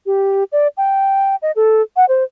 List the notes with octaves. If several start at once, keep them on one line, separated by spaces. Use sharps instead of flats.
G4
D5
G5
D#5
A4
F#5
C5